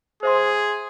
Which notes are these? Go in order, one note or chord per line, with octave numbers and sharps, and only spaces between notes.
G#4 C5 E5 C6